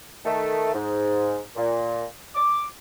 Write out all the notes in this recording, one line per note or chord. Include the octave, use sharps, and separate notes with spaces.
D#3 A3
G#2
A#2
D6